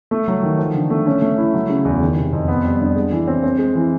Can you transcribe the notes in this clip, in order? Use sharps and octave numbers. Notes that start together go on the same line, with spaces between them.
A3
F#3
D#3
F3
D3
A3
C#4
A3
E4
F#3
C#3
E2
D#3
C3
F2
B3
G3
D4
G#3
E3
C4
C4
G#3
E3